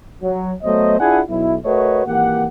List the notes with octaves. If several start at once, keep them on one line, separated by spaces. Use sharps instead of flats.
F#3
F#3 A3 B3 C5 D#5
D4 E4 F4 G#4 F#5 G#5
B1 E4
A3 F#4 A#4 B4 C#5 D#5
G#1 E3 A#3 G4 F#5